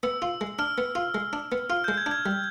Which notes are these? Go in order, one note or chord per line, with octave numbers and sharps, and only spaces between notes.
B3 E6
F4
G#3
D4 F6
B3
F4
G#3
D4
B3
F4 F6
G#3 G6
G#6
D4
G#6
G3